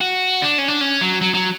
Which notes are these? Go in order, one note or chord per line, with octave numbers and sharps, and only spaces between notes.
F#4
D4
C#4
D4
C#4
F#3
F#3
F#3